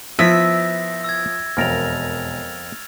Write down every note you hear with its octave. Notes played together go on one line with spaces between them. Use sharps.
F3 B3 E4 B4 E5 A#6
E6 G#6
E1 F2 A#4 F6 A6 F7